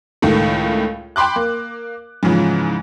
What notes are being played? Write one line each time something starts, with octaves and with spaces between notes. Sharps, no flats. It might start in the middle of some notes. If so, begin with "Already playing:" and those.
C#2 A2 D#3 A3
G5 B5 C6 D6 F#6
A#3
G#2 C#3 E3 F3